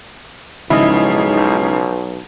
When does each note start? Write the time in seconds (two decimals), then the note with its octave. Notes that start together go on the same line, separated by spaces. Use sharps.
0.70 B1 G#2 C#3 F3 E4 D#5